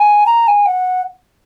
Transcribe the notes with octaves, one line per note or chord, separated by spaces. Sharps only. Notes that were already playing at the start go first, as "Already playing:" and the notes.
Already playing: G#5
A#5
G#5
F#5